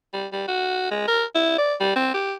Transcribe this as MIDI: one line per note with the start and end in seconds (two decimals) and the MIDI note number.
0.13 0.27 55
0.32 0.44 55
0.48 0.88 66
0.91 1.03 56
1.08 1.24 70
1.35 1.57 64
1.58 1.74 74
1.80 1.96 55
1.96 2.10 60
2.14 2.34 67